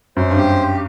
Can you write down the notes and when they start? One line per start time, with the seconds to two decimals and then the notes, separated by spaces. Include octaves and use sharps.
0.16 F#2 C5
0.31 G2
0.37 G4